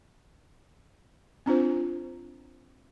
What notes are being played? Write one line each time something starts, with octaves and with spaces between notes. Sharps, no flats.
C4 D4 F4 C5